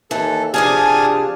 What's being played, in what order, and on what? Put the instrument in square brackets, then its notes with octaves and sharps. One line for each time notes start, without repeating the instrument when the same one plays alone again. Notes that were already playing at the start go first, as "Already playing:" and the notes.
[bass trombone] D#2 [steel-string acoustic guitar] E3 [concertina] A4
[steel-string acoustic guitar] C3 F3 G#4 [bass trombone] D4 [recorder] G#5 [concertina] A5 D#6 F6